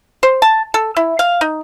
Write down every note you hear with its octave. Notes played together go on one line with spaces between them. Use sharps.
C5
A5
A4
E4
F5
D#4